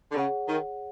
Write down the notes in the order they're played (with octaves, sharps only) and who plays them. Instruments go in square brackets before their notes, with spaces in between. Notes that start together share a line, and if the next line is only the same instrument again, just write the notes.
[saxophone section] D3
[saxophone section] C#3 [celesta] G#4 C#5 F#5
[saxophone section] D#3